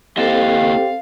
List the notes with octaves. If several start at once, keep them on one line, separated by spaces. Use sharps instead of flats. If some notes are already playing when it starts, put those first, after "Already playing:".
A#3 C4 E4 G4 A4 C5 D#5 F5